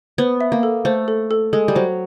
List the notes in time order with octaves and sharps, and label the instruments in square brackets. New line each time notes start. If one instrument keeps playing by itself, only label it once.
[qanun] B3 [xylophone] C5
[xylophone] E5
[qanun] A#3
[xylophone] A4
[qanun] A3 [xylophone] C5
[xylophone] A4
A4
[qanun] G#3 [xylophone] A4
[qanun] G3
[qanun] F#3 [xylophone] C5